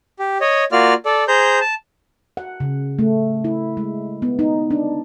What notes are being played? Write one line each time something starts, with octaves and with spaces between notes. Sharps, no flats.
G4
C#5 D#5
A#3 F4 F#4 D5 F6
A4 D5
G#4 C5 A#5 G6
A5
F#5
C#3
A3
E4
G#3
B3
D#4
D4